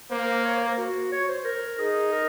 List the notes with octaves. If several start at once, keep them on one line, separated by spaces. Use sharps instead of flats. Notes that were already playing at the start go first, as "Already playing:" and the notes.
A#3 C5
C#5
C5
A#4
F#4
C#5
C5
A#4
D#4 G#4
A#4